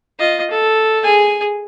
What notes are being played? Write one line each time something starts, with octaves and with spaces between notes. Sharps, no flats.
F4 D#5
A4
G#4 G#5